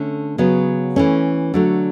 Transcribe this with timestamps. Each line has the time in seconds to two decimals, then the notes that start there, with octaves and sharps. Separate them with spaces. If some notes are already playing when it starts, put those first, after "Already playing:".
Already playing: D3 A3 C#4
0.38 C#3 F#3 B3
0.96 E3 A3 C#4
1.54 D3 F#3 A3